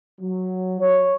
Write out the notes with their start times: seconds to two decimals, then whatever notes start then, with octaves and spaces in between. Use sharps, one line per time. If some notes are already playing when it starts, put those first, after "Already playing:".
0.20 F#3
0.80 C#5